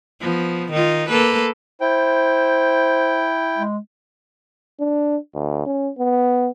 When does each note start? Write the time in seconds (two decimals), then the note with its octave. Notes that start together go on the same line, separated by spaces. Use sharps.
0.20 F3 B3
0.72 D#3 D#4 F4
1.08 A#3 A4 B4
1.81 E4 C5 G5
3.58 G#3
4.80 D4
5.34 D2
5.66 C#4
5.98 B3